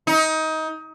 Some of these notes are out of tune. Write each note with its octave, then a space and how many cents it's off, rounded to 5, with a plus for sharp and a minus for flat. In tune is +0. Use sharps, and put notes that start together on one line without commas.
D#4 +25